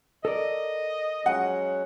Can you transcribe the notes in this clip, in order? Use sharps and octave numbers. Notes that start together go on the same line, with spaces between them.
A4 A#4 D5 D#5
F#3 G#3 C#4 F#5